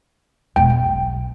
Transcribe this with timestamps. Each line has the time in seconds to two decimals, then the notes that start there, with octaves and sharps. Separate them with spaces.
0.56 E1 B2 G5
0.70 B1